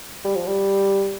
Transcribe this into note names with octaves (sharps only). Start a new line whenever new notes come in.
G3
F3
G3